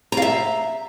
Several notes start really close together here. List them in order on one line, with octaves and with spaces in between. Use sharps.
A#5 F5 E5